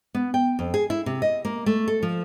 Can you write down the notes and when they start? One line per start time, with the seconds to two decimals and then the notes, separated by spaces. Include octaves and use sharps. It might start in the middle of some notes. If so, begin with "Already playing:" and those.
0.15 B3
0.34 G5
0.59 F2
0.74 G#4
0.90 E4
1.06 C3
1.22 D#5
1.45 A#3
1.66 A3
1.88 A4
2.03 F3